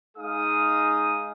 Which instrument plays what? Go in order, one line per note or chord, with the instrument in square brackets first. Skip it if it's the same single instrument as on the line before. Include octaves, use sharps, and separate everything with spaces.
[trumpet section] G#3 D#4 G#4 F5 D#6